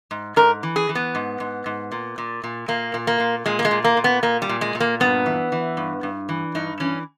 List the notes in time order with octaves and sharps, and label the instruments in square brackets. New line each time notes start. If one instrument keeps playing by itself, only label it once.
[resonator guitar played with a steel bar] G#2
G#2 A#4
E3
G#4
E3
B3
G#2
G#2
G#2
A#2
A#2
A#2
A#2 A#3
A#2
A#3
A#2
A#2 G#3
A#3
G#3
A#2
A#3
A#2
B3
A#2 A#3
G3
A#2
G#3
A#2
A#3
G2 B3
E3
E3
G2
G2
E3
G2 D#4
E3 C#4